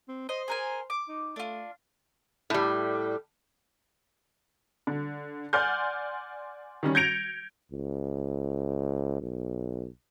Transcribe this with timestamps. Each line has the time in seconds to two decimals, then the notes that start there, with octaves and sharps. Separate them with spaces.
0.08 C4
0.29 C5 D#5
0.48 G#4 A#4 G#5
0.90 D6
1.08 D#4
1.36 A3 D4 F4
2.50 A2 G3
4.87 D3
5.53 D5 F#5 G#5 C6 F6 G6
6.83 D#3 G3 C#4
6.95 G6 G#6 A#6 C#7 D7 F7
7.72 C#2
9.22 B1